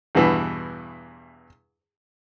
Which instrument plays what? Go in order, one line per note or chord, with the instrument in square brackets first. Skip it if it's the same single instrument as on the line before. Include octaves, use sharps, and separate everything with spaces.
[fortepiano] E2 G2 B2 E3